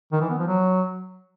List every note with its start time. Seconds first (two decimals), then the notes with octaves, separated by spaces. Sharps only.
0.12 D#3
0.21 E3
0.30 B3
0.39 F3
0.47 F#3